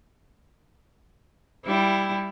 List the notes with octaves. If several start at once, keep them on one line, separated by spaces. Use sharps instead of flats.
G3 E4